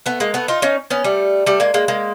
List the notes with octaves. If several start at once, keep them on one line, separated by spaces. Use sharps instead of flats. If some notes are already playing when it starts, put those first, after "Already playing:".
A3 B3
G#3 A#3
A3 B3
D#4 F4
C#4 D#4
B3 C#4
G3 A3
G3 A3
G#3 A#3
G#3 A#3
G#3 A#3